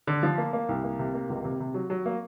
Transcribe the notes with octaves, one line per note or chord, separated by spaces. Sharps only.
D3
F3
A#3
A#3
C2
A#3
C3
A#3
C#2
C3
C3
F#3
F#3
A#3